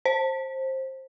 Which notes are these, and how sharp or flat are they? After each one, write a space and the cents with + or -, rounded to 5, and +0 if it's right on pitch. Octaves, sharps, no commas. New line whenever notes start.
C5 +20